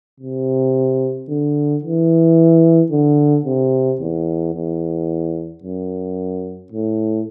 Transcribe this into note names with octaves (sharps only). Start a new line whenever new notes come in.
C3
D3
E3
D3
C3
E2
E2
F#2
A2